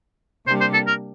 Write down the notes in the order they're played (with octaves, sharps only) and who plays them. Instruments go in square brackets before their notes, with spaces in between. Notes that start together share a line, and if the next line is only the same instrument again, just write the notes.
[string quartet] C3 G3 A#3 D4 G4 [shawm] C5
[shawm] C5
A4
A#4